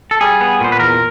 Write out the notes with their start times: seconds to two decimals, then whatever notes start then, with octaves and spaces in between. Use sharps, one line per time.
0.11 A4
0.21 G3 G#4
0.41 B3
0.60 A#2 C5
0.72 B4
0.80 E2 A#4